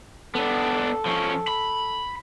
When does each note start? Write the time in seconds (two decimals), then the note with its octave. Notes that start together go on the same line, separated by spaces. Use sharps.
0.35 B3 D4 A4
1.06 F3 C#4
1.48 B5